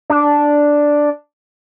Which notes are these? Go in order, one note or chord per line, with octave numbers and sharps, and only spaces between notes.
D4